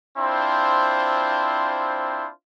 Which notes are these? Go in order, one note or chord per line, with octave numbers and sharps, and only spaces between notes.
C4 D4 E4 F4 C5